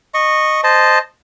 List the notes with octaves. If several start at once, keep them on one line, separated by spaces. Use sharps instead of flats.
D#5 C#6
C5 D#5 A5